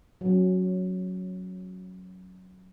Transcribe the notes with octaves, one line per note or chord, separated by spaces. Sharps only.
F#3 C#4